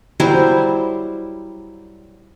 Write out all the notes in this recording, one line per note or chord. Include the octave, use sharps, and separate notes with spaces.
F#3 G3 E4 C5